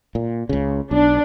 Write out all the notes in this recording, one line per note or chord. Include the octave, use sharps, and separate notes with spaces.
A#2
C#2 C#3
B1 D4